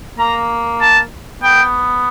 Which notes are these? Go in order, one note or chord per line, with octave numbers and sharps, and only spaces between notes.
A#3 A#5
A5
B3 G5